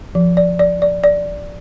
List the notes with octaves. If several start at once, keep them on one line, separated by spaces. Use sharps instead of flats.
F3
D5
D5
D5
D5